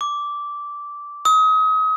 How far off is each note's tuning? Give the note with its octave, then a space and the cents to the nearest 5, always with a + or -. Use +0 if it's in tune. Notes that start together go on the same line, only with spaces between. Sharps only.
D6 -10
D#6 +35